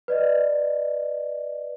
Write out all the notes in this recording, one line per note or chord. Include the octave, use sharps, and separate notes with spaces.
B4 D5 D#5